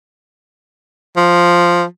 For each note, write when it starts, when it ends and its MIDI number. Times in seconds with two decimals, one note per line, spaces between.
1.17 1.84 53